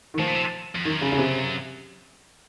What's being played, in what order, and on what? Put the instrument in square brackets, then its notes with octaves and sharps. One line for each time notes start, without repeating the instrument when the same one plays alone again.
[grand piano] D#3
[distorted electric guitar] A2 [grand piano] F3
[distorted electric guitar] A#2
C3
F2
[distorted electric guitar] F#2 [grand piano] D#3
[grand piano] C#3
C#3
C3